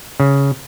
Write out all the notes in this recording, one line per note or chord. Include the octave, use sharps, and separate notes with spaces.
C#3